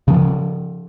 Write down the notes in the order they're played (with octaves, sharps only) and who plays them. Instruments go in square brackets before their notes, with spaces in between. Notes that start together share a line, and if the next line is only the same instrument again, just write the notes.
[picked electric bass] C#3 F3